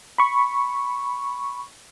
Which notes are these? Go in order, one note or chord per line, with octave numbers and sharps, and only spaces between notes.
B5 C#6